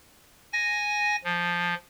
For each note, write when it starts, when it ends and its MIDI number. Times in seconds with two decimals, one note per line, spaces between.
0.53 1.16 80
0.53 1.16 94
1.24 1.75 53